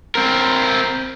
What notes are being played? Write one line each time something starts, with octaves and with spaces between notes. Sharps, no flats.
C4 A#4